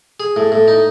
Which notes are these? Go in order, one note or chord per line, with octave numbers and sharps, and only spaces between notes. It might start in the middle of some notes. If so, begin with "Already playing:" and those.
G#4
A2
A2
D#4